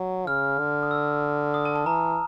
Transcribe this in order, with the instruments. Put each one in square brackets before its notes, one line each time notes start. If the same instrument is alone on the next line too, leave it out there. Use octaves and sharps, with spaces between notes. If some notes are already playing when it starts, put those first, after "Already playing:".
Already playing: [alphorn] F#3
[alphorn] C#3 [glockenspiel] F6
[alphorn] D3
[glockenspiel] D#6
E6
D#6
A5
A5
[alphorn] E3 [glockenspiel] A#5